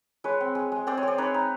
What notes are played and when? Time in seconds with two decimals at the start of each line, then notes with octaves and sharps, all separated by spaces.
0.24 G#3 B4 C#5
0.41 C4
0.55 G#3
0.72 G#3
0.87 C4 C5 D5
0.97 C#5 D#5
1.03 C4 C5 D5
1.18 D#4 B4 C#5
1.34 D#4